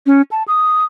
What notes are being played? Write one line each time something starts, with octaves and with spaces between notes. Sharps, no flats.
C#4
A5
D#6